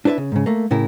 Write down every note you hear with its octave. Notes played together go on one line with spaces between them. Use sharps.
D4 E4 B4 C5 E5
C#3
G#2 C#3
A3 A#3
A2 C#3 E4 A#4